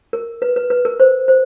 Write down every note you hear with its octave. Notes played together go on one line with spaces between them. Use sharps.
A#4
B4
B4
B4
A#4
C5
C5